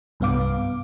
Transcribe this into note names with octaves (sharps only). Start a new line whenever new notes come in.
C2 G2 B3 F5 D6